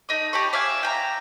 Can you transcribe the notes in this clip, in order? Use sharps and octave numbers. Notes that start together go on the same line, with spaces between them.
A3 D#4 D#6
G4 A5 B5 C#6
D5 E5 F5 G#5
G5 G#5 A#5